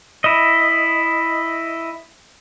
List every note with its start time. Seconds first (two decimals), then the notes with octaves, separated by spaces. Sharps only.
0.24 E4 D#5